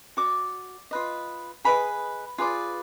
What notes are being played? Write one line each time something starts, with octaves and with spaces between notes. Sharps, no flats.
F#4 D5 D6
F4 B4 D#5
G#4 B4 D#5 B5
F4 G#4 B4 D5